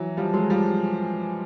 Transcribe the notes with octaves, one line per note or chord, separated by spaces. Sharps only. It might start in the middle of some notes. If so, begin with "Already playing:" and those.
Already playing: E3 F#3
F3 G3
F#3 G#3
F3 G3